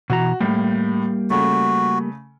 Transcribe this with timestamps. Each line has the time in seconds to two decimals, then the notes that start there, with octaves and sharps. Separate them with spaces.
0.10 B2 E3 F#4 A#5
0.41 A2 G3 A#3 G4
1.30 C#3 A3 F#4